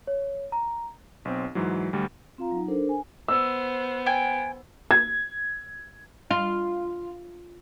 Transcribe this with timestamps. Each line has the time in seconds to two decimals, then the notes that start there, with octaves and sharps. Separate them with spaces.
0.07 C#5
0.52 A#5
1.25 B1 C4
1.55 G#2 E3 F#3
1.93 D2 G3
2.38 C4 F4 F5 A#5
2.51 F#3 D#4
2.68 D4 A4 A#4 C5
2.89 G#5
3.28 B3 C5 E6
4.06 G5 G#5
4.91 G#6
6.31 F4